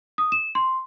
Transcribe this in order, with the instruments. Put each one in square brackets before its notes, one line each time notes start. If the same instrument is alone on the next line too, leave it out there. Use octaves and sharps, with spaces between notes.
[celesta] D#6
E7
C6